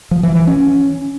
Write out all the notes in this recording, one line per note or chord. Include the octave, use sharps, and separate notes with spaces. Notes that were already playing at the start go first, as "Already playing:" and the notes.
F3
E3
E3
C#4